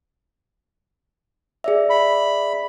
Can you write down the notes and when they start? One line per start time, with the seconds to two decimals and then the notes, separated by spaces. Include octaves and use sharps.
1.64 G#4 D5 E5
1.90 B5